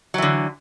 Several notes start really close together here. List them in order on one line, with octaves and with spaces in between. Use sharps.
F#3 E3 D3